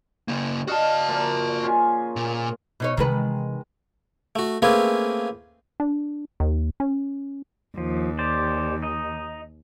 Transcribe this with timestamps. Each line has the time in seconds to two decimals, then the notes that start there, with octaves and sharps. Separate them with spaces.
0.28 C#3 A#3
0.68 F#4 D5 D#5 F5 A5
1.08 A#2 F3 A#3
1.63 C#3 F4 G#5
2.16 A#2
2.80 B2 D#4 C#5
2.97 C3 D#3 E3 G#3 B4
4.35 A3 F#4
4.62 A3 A#3 C4 C#4 G#4 B4
5.80 D4
6.40 D#2
6.80 C#4
7.78 D#2 F3
8.19 G4 C5 D5
8.82 D#4 D#5